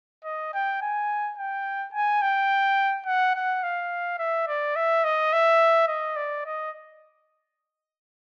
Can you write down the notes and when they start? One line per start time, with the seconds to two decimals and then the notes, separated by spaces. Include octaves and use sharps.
0.24 D#5
0.54 G5
0.82 G#5
1.38 G5
1.94 G#5
2.22 G5
3.06 F#5
3.35 F#5
3.63 F5
4.19 E5
4.48 D5
4.76 E5
5.04 D#5
5.33 E5
5.88 D#5
6.16 D5
6.45 D#5